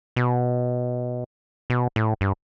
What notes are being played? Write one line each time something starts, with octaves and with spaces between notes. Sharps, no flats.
B2
B2
A2
G2